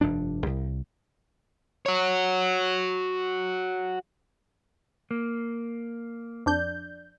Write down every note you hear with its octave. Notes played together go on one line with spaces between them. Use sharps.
F1 G2 F3 D4
C2
F#4 C#5
A#3
F2 D4 G6